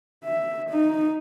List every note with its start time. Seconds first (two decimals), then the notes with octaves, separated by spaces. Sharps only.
0.24 E5
0.70 D#4